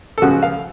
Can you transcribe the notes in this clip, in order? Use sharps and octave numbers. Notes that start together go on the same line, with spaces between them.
A4
C#2 C#3 F3 F#4
F5